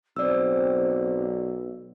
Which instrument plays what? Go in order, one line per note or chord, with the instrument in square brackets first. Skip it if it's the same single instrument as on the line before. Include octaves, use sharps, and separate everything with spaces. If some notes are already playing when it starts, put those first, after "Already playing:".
[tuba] B1 [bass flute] C4 [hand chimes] D5 E6